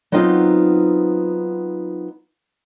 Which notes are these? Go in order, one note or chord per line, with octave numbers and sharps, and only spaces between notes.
F#3 B3 C4 D#4 F4